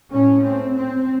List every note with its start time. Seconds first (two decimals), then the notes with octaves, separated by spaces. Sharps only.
0.11 A2 C#4
0.43 C4
0.76 C4